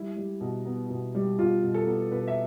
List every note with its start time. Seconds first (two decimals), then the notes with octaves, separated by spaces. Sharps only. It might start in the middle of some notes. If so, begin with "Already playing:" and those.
Already playing: G3 E4
0.17 G3
0.41 B2
0.66 B3
0.90 B2
1.15 G3
1.39 B2 F4
1.63 B2
1.74 A4
1.87 B3
2.11 B2 B4
2.28 E5